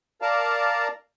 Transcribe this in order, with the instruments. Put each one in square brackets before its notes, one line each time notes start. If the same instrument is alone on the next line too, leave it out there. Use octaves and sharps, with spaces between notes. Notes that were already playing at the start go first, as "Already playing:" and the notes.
[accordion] A#4 D5 F5 A5 A#5